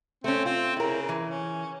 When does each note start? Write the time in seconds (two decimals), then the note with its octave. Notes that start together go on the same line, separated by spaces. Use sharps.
0.24 A3 C4 C#4
0.46 C4 F4
0.77 C#3 E4 A#4
1.09 E3
1.27 C#4